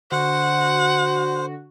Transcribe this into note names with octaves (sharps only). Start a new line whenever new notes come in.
D3 F#4 C5 F#5